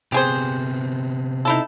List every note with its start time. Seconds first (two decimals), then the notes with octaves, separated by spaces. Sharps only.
0.12 C3 B3 G4 G#4 C5
1.45 D#4 E4 A4